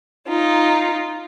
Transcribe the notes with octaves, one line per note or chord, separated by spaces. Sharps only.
D#4 F4